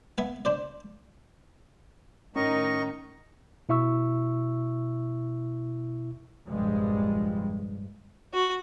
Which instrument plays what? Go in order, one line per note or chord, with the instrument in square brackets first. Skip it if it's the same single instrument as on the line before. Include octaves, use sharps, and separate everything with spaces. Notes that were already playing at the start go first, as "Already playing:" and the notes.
[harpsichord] B3 E5 F5 G#5
D4 C5 D5
[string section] A2 D#3 D#4 [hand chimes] C#4 [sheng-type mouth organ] A#4 D#5 C#6
[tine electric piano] B2 E4 E5 C#6 E6
[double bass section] F1 A#1 G2 F3 G3 G#3
[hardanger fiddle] F#4